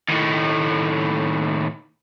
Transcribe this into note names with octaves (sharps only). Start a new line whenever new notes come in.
D#2 A2